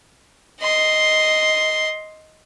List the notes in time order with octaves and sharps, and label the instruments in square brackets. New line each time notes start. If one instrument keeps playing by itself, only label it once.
[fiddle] D#5 C6